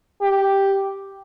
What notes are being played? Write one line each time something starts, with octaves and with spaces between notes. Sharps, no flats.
G4